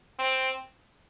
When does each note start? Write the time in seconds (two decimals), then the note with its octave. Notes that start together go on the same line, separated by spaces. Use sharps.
0.19 C4